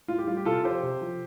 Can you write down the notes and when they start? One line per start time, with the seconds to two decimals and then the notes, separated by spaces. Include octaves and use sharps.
0.08 A2 F4
0.18 G4
0.27 G3 F4
0.37 G4
0.45 C3 F4 A4
0.64 F3 G4 C5
0.83 C3
1.01 F3